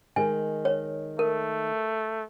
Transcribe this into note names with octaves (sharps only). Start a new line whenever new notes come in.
D#3 G#3 G#5
C#5
A3 A#4